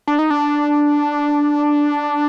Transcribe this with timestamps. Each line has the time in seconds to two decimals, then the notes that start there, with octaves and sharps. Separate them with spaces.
0.07 D4
0.19 D#4
0.30 D4